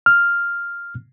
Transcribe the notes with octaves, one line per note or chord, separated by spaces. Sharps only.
F6